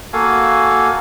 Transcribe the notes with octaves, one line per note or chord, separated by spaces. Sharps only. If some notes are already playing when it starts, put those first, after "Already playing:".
A#3 F#4 A4 F5 G#5